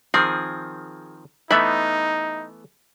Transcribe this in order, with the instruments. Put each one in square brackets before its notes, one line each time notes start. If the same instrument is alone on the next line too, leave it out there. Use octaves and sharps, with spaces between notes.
[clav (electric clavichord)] D#3 F3 C4 [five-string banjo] G#4
[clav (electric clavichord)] E3 A3 B3 [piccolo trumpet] D#4 [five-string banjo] E5 B5